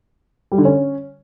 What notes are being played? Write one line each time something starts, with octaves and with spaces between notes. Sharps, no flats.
G3
D3
C#4